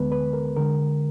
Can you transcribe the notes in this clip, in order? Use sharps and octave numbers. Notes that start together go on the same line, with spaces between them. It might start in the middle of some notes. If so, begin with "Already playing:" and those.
Already playing: D2 D3 G#3 B3 B4
B4
A#4
D3 G#3 A#4